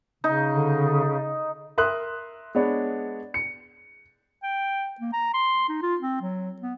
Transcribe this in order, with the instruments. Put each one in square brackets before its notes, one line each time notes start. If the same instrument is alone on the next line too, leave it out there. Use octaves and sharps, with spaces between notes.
[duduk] C#3 [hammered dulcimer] D#4
[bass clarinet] D3
[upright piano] A#4 E5 C6 D#6 F#6
G#3 B3 D4 C#5
C#7
[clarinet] G5
A#3
A#5
C6
D#4
F4
C4
F#3
B3